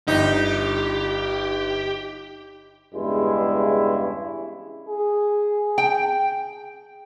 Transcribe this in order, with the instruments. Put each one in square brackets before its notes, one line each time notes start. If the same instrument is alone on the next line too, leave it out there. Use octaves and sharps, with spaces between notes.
[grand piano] G1 [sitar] D#4 [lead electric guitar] G4
[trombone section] E2 G2 C#3 G#3 E4
[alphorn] G#4
[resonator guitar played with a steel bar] G5